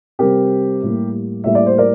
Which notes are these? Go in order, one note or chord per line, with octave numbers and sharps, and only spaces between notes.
C3 G3 C4 G4 A#4
A2 G3 A#3
A2 G3 A#3 E5
D5
C5
A#4 D5